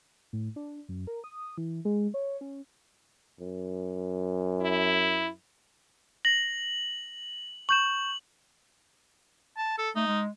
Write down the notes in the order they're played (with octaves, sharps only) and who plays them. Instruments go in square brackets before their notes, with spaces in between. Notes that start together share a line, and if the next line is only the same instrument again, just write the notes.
[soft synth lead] A2
D4
F#2
A#4
D#6
E3
G#3
C#5
C#4
[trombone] F#2
[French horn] E4
[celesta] A#6 [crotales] F#7
[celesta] C#6 G6 E7 [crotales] F#7
[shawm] A5
A4
[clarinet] A3 [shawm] D#4
[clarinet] G#3